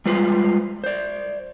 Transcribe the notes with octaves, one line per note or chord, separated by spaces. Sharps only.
G3 G#3 F4 B4 C5
C5 D5